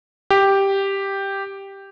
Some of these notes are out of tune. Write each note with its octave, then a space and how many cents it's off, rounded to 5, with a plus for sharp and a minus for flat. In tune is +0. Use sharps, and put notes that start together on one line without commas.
G4 +0